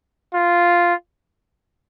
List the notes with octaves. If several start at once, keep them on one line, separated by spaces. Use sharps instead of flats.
F4